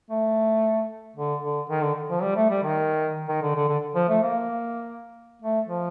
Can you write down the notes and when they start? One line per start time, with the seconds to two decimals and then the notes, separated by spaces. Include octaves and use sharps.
0.10 A3
1.16 D3
1.43 D3
1.70 D#3
1.83 D3
2.09 F3
2.22 G3
2.36 A3
2.50 G3
2.63 D#3
3.28 D#3
3.42 D3
3.56 D3
3.68 D3
3.95 F3
4.09 A3
4.22 A#3
5.42 A3
5.68 F3